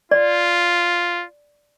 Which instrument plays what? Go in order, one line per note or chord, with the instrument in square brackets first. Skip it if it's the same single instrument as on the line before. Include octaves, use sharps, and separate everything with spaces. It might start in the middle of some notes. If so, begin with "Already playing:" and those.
[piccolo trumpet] F4 [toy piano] D5